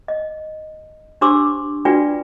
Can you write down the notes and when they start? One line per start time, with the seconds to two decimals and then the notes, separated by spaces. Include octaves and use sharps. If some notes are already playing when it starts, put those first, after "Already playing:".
0.08 D#5
1.21 D4 G4 C5 C6 D6 E6
1.85 D4 F4 F#4 B4 D5 G5